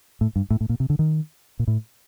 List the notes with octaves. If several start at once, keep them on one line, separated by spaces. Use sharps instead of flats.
A2
G2
A2
A2
A#2
C3
D3
D#3
A#2
A2